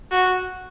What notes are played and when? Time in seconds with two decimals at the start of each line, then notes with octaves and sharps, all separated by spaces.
0.12 F#4